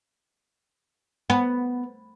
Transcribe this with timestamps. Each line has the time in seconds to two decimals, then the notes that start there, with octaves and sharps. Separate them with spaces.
1.30 B3